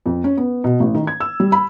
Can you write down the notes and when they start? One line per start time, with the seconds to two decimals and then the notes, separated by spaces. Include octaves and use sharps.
0.06 F2
0.24 C#4
0.37 B3
0.64 B2
0.80 A1
0.94 D#3
1.07 G#6
1.20 E6
1.40 G3
1.52 B5